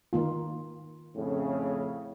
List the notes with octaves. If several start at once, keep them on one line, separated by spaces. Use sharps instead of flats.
D#3 A#3 F4
F2 A2 C#3